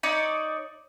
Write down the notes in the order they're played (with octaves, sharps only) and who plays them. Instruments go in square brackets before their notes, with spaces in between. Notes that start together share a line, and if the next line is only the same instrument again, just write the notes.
[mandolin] D#4 C#5 D5